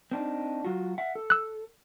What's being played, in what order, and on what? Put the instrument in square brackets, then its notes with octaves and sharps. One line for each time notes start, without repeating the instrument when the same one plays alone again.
[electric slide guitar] C4 D4 D#4
F#3 F4 F#4
E5 F#5
A4
[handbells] E6 F#6